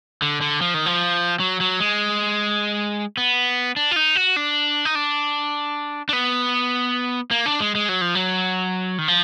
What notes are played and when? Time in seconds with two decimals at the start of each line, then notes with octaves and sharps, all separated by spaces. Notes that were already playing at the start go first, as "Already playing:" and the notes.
0.22 D3
0.41 D3
0.61 F3
0.74 D#3
0.86 F3
1.40 F#3
1.60 F#3
1.80 G#3
3.17 B3
3.76 D4
3.91 F4
3.96 D#4
4.16 F#4
4.36 D4
4.85 D#4
4.95 D4
6.09 D4
6.13 B3
7.31 A#3
7.46 D4
7.60 G#3
7.75 G#3
7.89 F#3
8.01 F3
8.15 F#3
8.98 D#3
9.08 F3